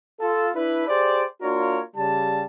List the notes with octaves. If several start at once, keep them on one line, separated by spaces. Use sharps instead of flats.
F4 A4
D4 E4 B4
G4 G#4 C5 D5
A#3 D4 F4 F#4 A#4 C#5
C#3 G3 A5